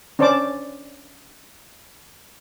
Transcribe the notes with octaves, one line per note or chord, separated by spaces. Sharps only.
C#4 D4 C5 D5 A5 D6